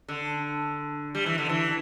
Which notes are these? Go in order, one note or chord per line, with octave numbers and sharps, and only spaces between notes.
D3
G3
E3
D3
E3